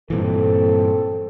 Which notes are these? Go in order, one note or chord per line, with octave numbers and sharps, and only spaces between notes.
G2 A#2 E3 C4 A4